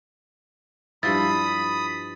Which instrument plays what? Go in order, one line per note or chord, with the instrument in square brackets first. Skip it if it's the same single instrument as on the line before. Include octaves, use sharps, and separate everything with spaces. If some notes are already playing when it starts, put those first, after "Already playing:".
[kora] G2 F3 E4 [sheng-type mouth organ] B5 D#6 [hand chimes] A6